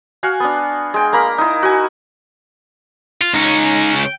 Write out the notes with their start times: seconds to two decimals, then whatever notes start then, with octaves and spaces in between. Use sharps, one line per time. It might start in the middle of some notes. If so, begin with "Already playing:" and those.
0.23 F#4 F5 G#5
0.40 B3 D4
0.94 G#3 G5
1.13 A#3 A#5 B5
1.38 D#4 E4
1.63 F#4 G#5
3.21 F4
3.34 C#2 C#4 D#4
3.98 G5